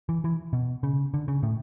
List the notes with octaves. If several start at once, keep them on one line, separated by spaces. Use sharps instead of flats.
E3
E3
B2
C#3
D3
C#3
A2